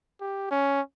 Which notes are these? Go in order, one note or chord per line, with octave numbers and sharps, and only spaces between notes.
G4
C#4